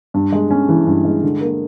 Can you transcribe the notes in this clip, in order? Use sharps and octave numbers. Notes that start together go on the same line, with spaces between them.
G2
G#3
C#4
E3
G2
G#3
D3
A#3